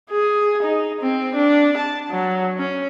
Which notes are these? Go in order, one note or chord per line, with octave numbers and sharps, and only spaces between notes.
G#4
D#4
C4
D4
A5
F#3
C#4